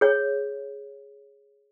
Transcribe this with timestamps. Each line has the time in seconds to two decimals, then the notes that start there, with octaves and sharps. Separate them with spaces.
0.01 G#4 C#5